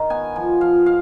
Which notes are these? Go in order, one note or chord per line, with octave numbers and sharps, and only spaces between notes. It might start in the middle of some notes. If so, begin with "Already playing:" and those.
Already playing: D#3
B3 G#5
F3 G#5
F3 F5
F5